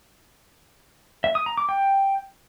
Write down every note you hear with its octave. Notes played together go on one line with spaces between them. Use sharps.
E5
D#6
A#5
D6
G5